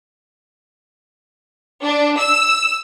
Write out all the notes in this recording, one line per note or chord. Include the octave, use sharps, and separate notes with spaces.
D4
E6